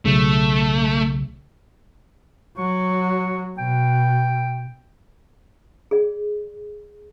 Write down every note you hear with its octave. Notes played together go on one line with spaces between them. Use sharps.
B1 C#3 A3
F#3 C#6
B2 G5
G#4 D5